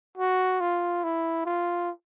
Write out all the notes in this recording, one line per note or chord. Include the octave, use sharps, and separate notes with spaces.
F#4
F4
E4
F4